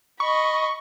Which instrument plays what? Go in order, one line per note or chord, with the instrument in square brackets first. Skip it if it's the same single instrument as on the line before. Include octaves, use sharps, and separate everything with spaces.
[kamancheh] D#5 B5 [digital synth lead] C#6